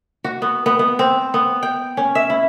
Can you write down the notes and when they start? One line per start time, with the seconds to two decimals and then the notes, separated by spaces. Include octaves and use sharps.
0.24 F#4
0.42 B3
0.66 B3
0.79 B3
0.99 C4
1.34 B3
1.63 G5
1.97 C#4
2.15 E5
2.30 E4